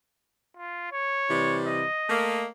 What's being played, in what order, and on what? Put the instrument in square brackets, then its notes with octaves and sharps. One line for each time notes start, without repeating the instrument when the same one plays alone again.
[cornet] F4
C#5
[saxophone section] C3 E3 G3
[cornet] D#5
[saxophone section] A3 A#3